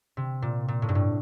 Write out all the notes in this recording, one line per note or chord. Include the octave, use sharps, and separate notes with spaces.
C3
A#2
A#2
A2
G2
A2